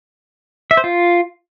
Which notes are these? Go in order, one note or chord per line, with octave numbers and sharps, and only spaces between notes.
E5
C5
F4